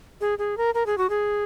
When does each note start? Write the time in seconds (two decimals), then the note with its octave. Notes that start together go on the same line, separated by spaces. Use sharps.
0.21 G#4
0.39 G#4
0.58 A#4
0.74 A#4
0.86 G#4
0.98 F#4
1.10 G#4